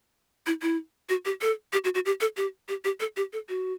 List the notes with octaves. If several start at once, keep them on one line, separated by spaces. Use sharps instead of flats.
E4
E4
F#4
G4
A4
G4
F#4
F#4
G4
A4
G4
G4
G4
A4
G4
A4
F#4